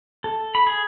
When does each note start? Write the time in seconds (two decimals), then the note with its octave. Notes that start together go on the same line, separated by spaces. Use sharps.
0.24 A4
0.55 B5
0.67 G#4